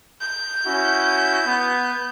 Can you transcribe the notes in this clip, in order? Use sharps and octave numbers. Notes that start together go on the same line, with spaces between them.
G6
C#4 E4 F#4
B3